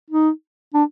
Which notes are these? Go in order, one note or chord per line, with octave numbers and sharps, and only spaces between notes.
D#4
D4